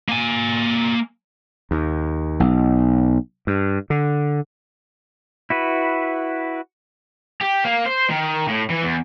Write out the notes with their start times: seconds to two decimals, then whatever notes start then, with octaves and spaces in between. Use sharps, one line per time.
0.09 A#3 G#5
1.71 D#2
2.40 B1
3.47 G2
3.90 D3
5.50 E4 F#4 B4
7.41 G4
7.64 A#3
7.86 C5
8.10 D#3
8.48 A2
8.70 E3
8.83 E2